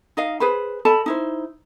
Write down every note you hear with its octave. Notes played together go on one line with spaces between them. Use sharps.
D#4 D#5 F5
G#4 B4 C5 B5
A4 D#5 A5 B5
D#4 E4 C5